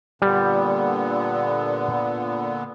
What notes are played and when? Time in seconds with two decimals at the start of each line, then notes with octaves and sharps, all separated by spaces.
0.22 A#2 D3 G3 B3